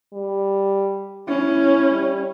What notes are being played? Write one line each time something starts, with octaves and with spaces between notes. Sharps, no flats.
G3
C#4 E4
G3